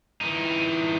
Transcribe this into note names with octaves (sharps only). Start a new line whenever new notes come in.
E3 D#4